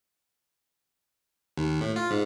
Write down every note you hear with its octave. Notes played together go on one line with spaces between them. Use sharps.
D#2
A2
F4
G#2